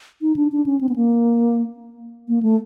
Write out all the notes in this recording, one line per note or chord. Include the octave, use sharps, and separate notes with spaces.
D#4
D4
D4
C#4
C4
B3
A#3
A#3
A3